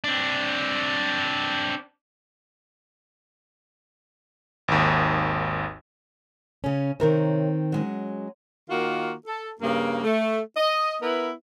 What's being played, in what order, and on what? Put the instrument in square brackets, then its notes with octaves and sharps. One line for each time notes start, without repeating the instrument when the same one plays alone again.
[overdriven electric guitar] C4 D4
[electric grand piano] G#1 D#2
[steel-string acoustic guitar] C#3 C#4
[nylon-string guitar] C3 A#4 C#5 [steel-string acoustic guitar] D#3 C4
[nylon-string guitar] F#3 G#3 C#4
[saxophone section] D#3 A#3 F4 F#4
A4
G2 C#3 A#3
A3
D#5
B3 E4 A#4 B4